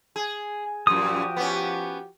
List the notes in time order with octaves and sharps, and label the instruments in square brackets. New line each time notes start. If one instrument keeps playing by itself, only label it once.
[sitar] G#4
[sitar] F#2 A#2 [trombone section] F3 F#4 G4 [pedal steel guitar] D#6
[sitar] B3 C#4